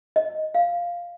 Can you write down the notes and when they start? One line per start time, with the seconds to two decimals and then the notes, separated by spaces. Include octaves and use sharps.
0.16 D#5
0.55 F5